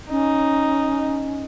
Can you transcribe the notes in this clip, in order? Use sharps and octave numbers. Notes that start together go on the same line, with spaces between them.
C#4 D#4